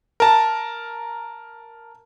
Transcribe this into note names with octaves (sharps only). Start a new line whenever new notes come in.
A#4 A5